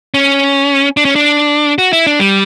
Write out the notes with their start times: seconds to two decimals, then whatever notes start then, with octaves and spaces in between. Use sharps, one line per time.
0.14 C#4
0.97 D4
1.05 C#4
1.16 D4
1.78 F#4
1.93 E4
2.07 D4
2.20 G3